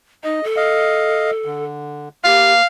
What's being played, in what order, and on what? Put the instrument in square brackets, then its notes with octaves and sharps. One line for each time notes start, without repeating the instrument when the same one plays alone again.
[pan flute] D#4 [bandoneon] D#5
[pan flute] A4
[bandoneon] D#5 F5
D3
[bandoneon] A#3 [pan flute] G4 [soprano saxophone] F5